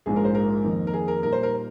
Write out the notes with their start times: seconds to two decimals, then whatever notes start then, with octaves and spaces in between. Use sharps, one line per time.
0.06 A#1 G#2 F3 G#3 G#4
0.16 A#4
0.25 C5
0.35 A#4
0.64 F2 D#3 A#3 D#4
0.87 A#4
0.93 G#4
1.08 A#4
1.23 A#2 G3 A#3 D#4 A#4
1.33 C5
1.43 A#4